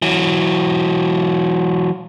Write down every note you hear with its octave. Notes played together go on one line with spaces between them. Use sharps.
E3 F#3